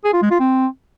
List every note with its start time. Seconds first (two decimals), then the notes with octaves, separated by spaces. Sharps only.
0.05 G#4
0.13 F4
0.22 G#3
0.31 F4
0.40 C4